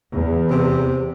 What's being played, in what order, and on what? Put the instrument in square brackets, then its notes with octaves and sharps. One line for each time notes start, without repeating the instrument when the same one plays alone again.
[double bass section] E2
[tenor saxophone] C3